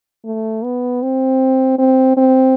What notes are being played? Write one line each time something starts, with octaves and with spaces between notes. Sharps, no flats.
A3
B3
C4
C4
C4